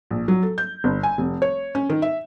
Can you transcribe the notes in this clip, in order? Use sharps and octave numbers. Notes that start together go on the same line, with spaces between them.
A#1
F#3
A4
G6
G1
G#5
F1
C#5
C#4
D#3
E5